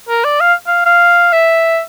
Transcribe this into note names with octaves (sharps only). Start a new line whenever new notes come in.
A#4
D5
F5
F5
F5
E5